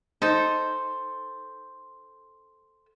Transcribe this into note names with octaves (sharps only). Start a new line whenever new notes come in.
D#4 A4 C5